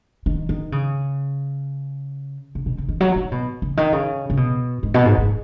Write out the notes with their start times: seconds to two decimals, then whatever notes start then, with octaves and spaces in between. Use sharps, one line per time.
0.26 D#3
0.49 D#3
0.72 C#3
2.55 C#3
2.66 B2
2.78 C#3
2.89 D#3
3.00 F#3
3.16 D#3
3.32 B2
3.62 C#3
3.77 D#3
3.92 C#3
4.30 C#3
4.37 B2
4.83 G#2
4.94 B2
5.06 G#2
5.18 G#2